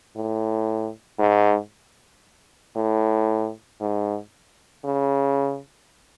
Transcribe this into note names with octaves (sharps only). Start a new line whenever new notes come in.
A2
G#2
A2
G#2
C#3